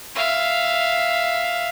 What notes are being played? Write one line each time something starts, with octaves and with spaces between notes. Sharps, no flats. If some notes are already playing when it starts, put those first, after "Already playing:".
E5 F5